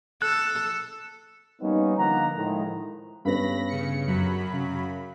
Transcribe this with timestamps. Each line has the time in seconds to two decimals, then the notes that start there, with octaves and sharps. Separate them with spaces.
0.22 A4 F#6
1.61 G3 A#3 B3 C#4 D#4
1.97 D3 F3 A#3 D#4 F#5 A#5
2.36 A2 D#3 F3 G#3
3.25 G2 B3 C#4 B5 A#6
3.68 C#3 C#7
4.07 F#2 F#3 B5
4.53 C#3